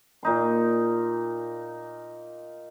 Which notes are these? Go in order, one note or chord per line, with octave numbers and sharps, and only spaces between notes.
A#2 D#4 C6